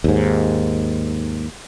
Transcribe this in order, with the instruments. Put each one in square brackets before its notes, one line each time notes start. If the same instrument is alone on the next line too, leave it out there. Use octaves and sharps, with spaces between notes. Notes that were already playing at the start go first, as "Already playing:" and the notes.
[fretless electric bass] D#2 G#2